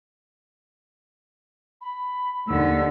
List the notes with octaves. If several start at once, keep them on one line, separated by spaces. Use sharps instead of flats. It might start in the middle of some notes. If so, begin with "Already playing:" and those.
B5
D#2 D3 E6